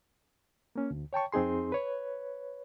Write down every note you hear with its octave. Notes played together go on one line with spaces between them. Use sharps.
A#3 C#4
D2
C#5 G5 A5 C#6
F2 C4 D#4 G#4 C6
B4 C#5